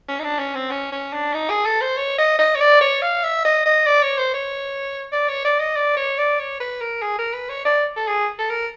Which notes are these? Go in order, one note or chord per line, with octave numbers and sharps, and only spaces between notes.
C#4
D#4
D4
C#4
C4
C#4
C#4
D4
D#4
G#4
A4
C5
C#5
D#5
D#5
C#5
D5
C#5
F5
E5
D#5
D#5
D5
C#5
C5
C#5
D5
C#5
D5
D#5
D5
C#5
D5
C#5
B4
A#4
G#4
A#4
B4
C#5
D5
A4
G#4
A4
A#4